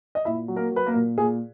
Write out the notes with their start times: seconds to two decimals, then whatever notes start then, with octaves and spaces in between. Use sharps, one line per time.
0.15 D#5
0.25 A#2 E4 E5
0.48 F#3
0.56 A#3 A#4
0.71 F#3
0.76 B4
0.86 A#3 A#4
0.94 A#2
1.17 A#2 G#4